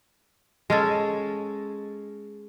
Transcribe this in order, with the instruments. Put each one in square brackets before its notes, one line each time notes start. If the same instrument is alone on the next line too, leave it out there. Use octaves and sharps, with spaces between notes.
[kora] G#3 C#4 A4